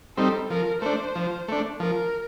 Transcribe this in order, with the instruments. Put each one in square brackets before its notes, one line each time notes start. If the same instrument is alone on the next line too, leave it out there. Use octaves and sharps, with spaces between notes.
[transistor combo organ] G3 C4 D#4 [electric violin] A4
[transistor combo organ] F3 [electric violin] A#4
[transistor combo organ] A3 D4 [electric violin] C5
[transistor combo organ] F3
A3 D4
[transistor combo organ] F3 [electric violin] A#4